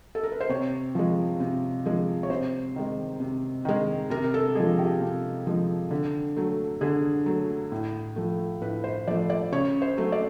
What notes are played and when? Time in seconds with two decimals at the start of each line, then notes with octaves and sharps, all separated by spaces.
0.15 A4
0.23 A#4
0.32 B4
0.40 C5
0.49 C3 C#5
0.95 F3 G#3
1.40 C3
1.86 F3 G#3
2.23 C#5
2.30 C3 C5
2.76 D#3 G#3
3.20 C3
3.65 D#3 G#3
4.10 C3 A#4
4.34 A4
4.55 F3 G#3 G#4
4.79 G4
5.00 C3
5.47 F3 G#3
5.91 D3
6.37 F#3 A3
6.81 D3 G#4
7.26 F#3 A3
7.72 A2
8.16 F3 A3
8.62 A2 B4
8.84 C5
9.07 F3 A3 D5
9.30 D5
9.52 C#3 C#5
9.82 C5
9.98 F#3 A3
10.12 D5